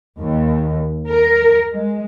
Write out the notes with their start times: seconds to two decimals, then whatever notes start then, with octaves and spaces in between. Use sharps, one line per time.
0.20 D#2
1.07 A#4
1.73 G#3